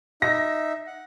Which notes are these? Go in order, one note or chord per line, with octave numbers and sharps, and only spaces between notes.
D#4 E5 A#6
F#5